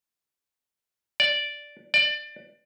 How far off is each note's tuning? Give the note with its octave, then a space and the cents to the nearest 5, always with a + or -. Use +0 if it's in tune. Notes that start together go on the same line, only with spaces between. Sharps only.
D5 -5
D5 +20